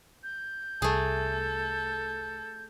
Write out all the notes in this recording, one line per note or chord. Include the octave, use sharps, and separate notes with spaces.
G6
C2 A3 G#4 A4